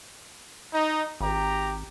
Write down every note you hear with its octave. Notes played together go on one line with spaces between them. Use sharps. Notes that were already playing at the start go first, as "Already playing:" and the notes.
D#4
G#1 G4 A#5